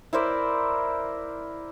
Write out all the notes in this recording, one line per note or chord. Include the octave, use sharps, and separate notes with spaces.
E4 A#4 C5 D5